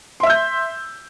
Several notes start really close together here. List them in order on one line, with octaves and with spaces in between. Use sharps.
C6 E5 E6 G6